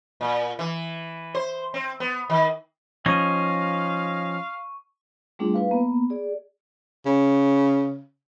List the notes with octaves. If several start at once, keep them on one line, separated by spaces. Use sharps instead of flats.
A#2
E3
C5
C4
B3
D#3
F3 C#4 D#4 F5 C#6 D#7
G3 A3 C4 D4 F4 G#4
E4 B4 F5
A#3 B3
G#4 D5
C#3